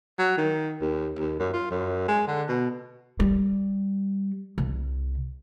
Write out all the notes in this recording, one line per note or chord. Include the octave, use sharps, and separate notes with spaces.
F#3
D#3
D#2
D#2
F#2
F4
F#2
G#3
D3
B2
G3
C2